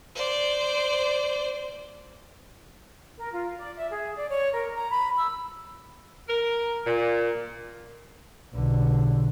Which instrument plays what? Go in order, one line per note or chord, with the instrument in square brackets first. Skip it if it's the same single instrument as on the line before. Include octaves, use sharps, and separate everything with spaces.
[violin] C5 D5
[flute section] A#4
F4
D5
E5
G#4
D5
C#5
A#4
A#5
B5
E6
[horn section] A#4
A#2
[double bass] B1 D3